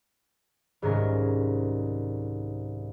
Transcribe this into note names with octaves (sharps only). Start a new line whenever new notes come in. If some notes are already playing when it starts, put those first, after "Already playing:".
C2 G#2 D#3 C#4 A#4